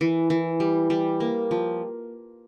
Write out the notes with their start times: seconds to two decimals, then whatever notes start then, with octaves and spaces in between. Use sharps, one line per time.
0.01 E3
0.30 E3
0.60 G3
0.90 G3
1.20 A#3
1.51 F3